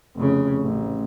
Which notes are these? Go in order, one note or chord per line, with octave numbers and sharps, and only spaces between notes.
F1 C#3
A1